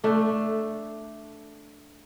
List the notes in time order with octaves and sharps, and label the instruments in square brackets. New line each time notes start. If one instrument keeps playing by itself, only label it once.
[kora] A3 D4